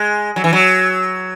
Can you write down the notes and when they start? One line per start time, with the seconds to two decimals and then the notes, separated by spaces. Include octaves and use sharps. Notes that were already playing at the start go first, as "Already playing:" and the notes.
Already playing: G#3
0.36 F#3
0.44 E3
0.53 F#3